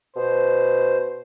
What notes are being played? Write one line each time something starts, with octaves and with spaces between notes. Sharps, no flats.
B2 C5